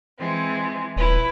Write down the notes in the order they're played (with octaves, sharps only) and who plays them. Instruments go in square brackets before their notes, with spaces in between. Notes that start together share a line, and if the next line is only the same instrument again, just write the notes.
[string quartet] E3 G#3 C4
[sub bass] D#1 [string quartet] E4 B4